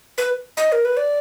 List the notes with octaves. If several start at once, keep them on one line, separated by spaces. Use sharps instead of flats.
B4
D#5
A#4
B4
D5